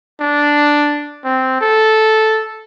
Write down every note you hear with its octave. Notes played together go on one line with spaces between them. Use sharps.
D4
C4
A4